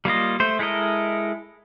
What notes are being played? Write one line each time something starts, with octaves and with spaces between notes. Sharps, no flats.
G3 A#3 F4 D#5
A3 C5
G#3 E4 A4 A#4 D#5